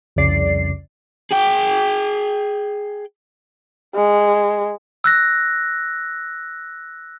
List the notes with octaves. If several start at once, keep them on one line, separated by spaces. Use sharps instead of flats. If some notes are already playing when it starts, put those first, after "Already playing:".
C2 F2 C#3 D5 C7
G#4 G5
G#3
E6 F#6 A#6